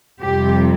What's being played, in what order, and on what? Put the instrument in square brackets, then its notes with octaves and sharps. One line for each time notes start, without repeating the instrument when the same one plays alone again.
[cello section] F2 C3 G3 G4